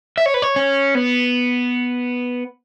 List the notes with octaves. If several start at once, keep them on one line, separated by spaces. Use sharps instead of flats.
E5
C#5
B4
C#5
C#4
B3